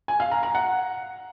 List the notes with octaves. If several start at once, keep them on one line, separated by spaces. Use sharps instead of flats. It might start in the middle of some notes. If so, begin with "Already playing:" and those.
G#5
F5
A#5
A#5
F#5